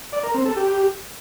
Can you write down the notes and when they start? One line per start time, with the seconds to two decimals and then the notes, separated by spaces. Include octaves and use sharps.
0.12 D5
0.23 A#4
0.34 C4
0.45 A4
0.56 G4